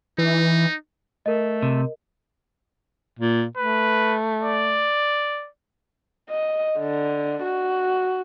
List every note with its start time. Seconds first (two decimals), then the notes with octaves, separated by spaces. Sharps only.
0.18 E3 D#4
1.26 A3 A#4 D#5
1.62 C3
3.19 A#2
3.57 A3 B4
4.42 D5
6.30 D#5
6.79 D3
7.43 F#4